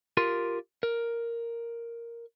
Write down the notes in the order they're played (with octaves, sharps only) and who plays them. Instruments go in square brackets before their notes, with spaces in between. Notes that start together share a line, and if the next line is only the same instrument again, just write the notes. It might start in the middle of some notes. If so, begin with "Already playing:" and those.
[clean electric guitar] F4 G4 A#4 C6
A#4